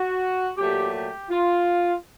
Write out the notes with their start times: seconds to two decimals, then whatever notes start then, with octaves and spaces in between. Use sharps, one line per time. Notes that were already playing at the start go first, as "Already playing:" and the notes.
Already playing: F#4
0.57 A#2 F#3 A3 G4
0.93 G4
1.29 F4